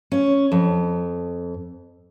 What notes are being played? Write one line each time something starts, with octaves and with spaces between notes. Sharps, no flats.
C#4
F2